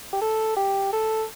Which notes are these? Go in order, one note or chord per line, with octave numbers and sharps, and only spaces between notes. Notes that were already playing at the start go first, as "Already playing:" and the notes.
G4
A4
G4
A4